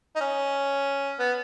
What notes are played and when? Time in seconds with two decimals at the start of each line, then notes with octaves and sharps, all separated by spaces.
0.16 D#4
0.21 C#4
1.19 B3